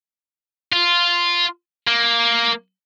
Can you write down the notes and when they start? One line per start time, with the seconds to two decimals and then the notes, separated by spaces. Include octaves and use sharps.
0.73 F4
1.87 A#3